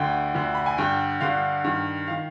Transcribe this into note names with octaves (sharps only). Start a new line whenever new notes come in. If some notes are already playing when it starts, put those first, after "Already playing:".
Already playing: D2 D3 G5
D2 D3
B5
G#5
G2 D3 G5
G2 D3 F5
G2 D#3
D#3 F5